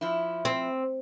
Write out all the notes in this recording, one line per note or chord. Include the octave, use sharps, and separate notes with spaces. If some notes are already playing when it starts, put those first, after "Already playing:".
F3 E4
C4